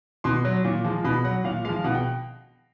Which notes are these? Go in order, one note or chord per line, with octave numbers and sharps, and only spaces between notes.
B2 C6
F#3
A#2
F3 G#3
B2 B5
F#3 F#5
A#2 F5
F3 G#3 F5
B2 F#5
G5